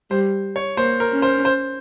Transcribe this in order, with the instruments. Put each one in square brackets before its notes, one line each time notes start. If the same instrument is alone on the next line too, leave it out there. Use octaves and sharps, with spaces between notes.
[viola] G3 [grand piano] C5
[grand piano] C#5
[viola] A#3 [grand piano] C5
[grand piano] A#4
[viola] C#4
[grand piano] C5
C5